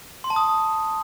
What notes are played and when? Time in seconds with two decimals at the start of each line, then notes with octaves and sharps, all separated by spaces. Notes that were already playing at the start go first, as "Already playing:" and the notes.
0.24 C6
0.30 A5
0.36 D#6